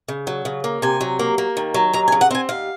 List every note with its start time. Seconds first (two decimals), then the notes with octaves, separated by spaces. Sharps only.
0.08 C#3
0.27 F#3
0.45 C#3
0.64 A#3
0.82 C3 G#5
1.01 F#3
1.19 A#3
1.38 A#3
1.57 D#3
1.74 F#3
1.93 D#2 A#5
2.08 G#5
2.12 C#3
2.21 F#5
2.31 C4 G#5
2.49 D#2 F5